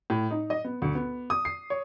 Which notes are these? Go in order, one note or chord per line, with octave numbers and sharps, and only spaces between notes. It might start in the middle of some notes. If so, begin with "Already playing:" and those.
A2
D#4
D#5
B3
D2
B3
D#6
C7
C#5